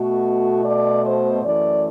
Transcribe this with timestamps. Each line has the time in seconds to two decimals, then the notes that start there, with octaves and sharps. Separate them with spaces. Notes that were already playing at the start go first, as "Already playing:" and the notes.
Already playing: B2 A3 F#4
0.64 D5
1.04 C5
1.43 F#2 E3 A3 D5